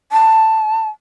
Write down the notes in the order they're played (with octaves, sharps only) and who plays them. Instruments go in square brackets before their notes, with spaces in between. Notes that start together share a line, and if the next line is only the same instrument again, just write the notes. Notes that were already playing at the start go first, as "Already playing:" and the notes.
[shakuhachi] A5